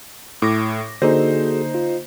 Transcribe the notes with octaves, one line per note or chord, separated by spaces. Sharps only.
A2 D6 A#6
D3 A#3 D#4 F#4 G#4 A4 C5
F4